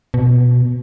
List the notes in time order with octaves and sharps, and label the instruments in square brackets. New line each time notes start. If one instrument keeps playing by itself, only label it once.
[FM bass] B2